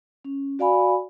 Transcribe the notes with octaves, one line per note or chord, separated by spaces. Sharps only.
C#4
F#4 D5 F5 G#5 B5